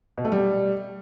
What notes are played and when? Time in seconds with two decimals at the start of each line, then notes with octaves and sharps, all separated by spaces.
0.18 B2
0.25 A3
0.32 G3